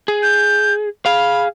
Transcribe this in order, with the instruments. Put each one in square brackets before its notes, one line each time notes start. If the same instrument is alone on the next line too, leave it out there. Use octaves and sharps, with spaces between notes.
[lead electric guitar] G#4
[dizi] G6
[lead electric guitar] G#4 F5 [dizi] B5